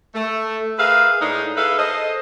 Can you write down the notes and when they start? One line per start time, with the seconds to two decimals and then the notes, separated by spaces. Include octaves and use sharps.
0.15 A3
0.78 G#4 A#4 B4 E5 F5
1.20 A2 G#3 D4 D#4
1.56 G#4 A4 B4 E5 F5
1.78 A4 C5 D#5